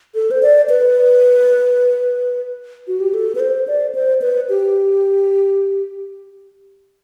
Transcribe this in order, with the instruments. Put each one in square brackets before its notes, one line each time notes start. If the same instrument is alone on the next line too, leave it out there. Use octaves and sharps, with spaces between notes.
[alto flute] A4
C5
D5
B4
F#4
G4
A4
B4
C5
D5
C5
B4
G4